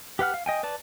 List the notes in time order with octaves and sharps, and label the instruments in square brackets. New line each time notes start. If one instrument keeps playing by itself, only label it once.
[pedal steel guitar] G4 B4 F#5 F6
F5
D#5 G5 G#5
B4 D5 A5